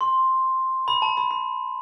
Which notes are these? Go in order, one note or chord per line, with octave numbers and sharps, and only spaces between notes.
C6
B5
A5
B5
B5